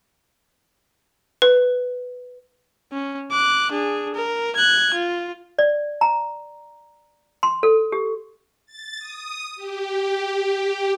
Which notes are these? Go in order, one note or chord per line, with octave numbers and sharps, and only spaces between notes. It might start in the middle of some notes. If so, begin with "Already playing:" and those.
B4
C#4
D6 F#6
D4 G#4
A#4
F#6 G#6
F4
D5
A#5
C6
A4
G4
A6
D#6
G4